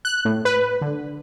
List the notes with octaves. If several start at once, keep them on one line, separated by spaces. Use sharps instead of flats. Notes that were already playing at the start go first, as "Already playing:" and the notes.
F#6
A2
B4
D3